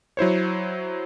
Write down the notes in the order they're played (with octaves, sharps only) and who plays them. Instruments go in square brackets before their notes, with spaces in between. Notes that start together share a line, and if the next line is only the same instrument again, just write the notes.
[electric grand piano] F#3 E4 C5 C#5